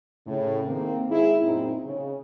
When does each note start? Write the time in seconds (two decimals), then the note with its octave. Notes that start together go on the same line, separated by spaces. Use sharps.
0.26 A2 C#3
0.66 D#3 A#3 C4
1.09 G#2 E4 G#4
1.42 F#2 A#2 C4 D#4
1.84 C#3